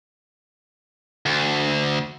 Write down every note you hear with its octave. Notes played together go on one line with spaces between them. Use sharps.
D2